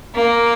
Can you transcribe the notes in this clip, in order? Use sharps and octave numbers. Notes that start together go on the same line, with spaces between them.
A#3